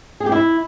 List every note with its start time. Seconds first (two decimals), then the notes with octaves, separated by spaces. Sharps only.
0.20 G#4
0.26 G4
0.32 E4